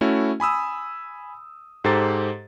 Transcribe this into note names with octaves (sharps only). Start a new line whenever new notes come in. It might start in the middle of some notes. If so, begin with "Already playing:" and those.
A3 C#4 E4 F#4
G#5 B5 D#6 E6
G#2 G4 A4 C5 A#5 A6